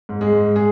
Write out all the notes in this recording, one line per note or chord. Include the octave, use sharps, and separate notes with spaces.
G#2
G#3 G#4
G#2
G#3 G#4